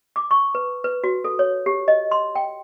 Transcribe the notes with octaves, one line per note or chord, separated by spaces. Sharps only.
D6
C#6
B4
B4
F#4
A4
C#5
G4
D#5
C6
G5